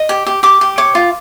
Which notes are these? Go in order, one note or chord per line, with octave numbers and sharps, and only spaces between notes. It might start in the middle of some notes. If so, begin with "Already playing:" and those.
Already playing: D#5
G4
G4
G4 D6
G4
C#5 D6
F4